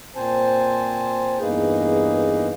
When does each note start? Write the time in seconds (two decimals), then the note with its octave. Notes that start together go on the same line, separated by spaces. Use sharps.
0.16 A#2 C4 C5 G#5 A5
1.40 E2 G2 A#3 D#4 G#4 B4